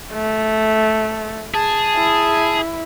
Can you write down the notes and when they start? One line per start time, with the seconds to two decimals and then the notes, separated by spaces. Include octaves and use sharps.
0.14 A3
1.54 G#4 A5
1.96 E4